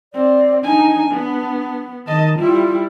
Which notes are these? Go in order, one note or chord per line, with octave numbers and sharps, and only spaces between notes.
C4 D5
D4 D#4 G#5
B3
D#3 D#5 A5
G3 E4 F4